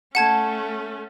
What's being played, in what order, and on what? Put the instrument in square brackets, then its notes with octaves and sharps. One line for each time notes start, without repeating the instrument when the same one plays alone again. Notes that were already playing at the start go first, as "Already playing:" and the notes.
[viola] A3 C#4 [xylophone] F#5 A5 G#6